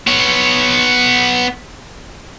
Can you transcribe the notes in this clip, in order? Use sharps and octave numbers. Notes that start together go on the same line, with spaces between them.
B3 C#5